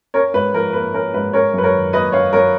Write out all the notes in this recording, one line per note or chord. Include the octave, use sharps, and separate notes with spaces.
C#4 A#4 C#5
G#2 B4
F3 A#4
A#3 B4
C#4 A#4
G#2 B4
C#4 A#4 C#5
F#2 B4
A#4 C#5
D#3
A#3 B4 D#5
C#4 C#5 F5
F#2 A#4 C#5